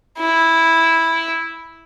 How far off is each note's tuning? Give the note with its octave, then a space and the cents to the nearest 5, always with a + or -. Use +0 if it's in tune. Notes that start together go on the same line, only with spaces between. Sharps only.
E4 -5